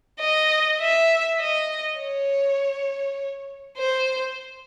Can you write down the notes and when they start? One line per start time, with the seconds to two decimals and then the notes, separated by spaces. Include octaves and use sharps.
0.20 D#5
0.80 E5
1.40 D#5
1.99 C#5
3.77 C5